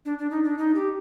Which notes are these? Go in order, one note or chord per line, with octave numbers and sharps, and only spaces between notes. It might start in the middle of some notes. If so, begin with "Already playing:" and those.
D4
D4
D#4
D4
D#4
G4